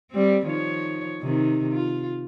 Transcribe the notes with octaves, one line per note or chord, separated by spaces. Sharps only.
G3 C4
D#3 F3 C#5
C3 D#3
F4